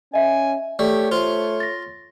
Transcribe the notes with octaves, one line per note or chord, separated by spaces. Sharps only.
C#4 D#5 E5 G#5
A3 G4 C#5 D5
A3 F4 C5
A6 A#6